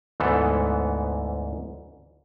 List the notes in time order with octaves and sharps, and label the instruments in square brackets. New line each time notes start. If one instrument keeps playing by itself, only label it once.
[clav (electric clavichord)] D2 G#2 E3 B3 A4